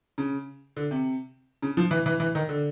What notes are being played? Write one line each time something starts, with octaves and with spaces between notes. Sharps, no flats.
C#3
D3
C3
C#3
F3
E3
E3
E3
D#3
D3